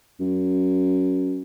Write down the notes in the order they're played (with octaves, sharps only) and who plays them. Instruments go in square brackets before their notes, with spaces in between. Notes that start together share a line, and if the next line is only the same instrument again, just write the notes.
[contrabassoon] F#2